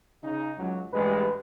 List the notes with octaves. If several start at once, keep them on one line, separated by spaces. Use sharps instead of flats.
C#3 D#4
C#2 F#3
A1 G2 G#3 B4